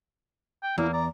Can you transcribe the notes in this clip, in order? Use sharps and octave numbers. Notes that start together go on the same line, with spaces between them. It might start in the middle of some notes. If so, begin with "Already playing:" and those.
G5
E2 A#3 E4
D5 A#5